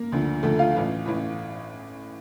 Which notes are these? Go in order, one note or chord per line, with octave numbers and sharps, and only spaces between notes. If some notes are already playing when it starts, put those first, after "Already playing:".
Already playing: A#3 A#4
D2 D3 F3
D2 D3 F3 A3 A4
F4 F5
A1 A2 E3
A1 A2 E3